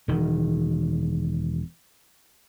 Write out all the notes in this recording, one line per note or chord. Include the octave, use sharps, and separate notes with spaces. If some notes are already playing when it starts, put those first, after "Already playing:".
E1 D#3